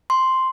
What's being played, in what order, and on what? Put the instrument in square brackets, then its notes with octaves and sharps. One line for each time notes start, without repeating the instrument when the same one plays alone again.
[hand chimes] C6